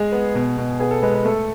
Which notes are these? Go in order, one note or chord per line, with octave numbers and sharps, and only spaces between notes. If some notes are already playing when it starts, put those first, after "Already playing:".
Already playing: G#3 G#4
B3
B2
B2
B3 G#4
A4
G#3 B4
B4
A3 A4